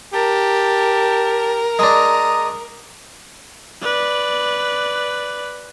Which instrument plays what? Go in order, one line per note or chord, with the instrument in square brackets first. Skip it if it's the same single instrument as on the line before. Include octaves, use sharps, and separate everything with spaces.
[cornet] G4 [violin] A#4 [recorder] A5
[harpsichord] G#3 D4 [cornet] A#5 [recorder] D#6
[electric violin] B4 D5